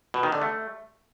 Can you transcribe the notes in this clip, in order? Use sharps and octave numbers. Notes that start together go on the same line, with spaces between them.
B2
D#3
D3
A3